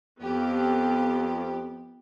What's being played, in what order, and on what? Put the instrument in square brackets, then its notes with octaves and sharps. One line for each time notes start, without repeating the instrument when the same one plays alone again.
[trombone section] F2 [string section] B3 G4